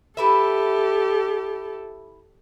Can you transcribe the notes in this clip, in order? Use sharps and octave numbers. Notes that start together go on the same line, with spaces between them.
E4 G4 A4 B4 E5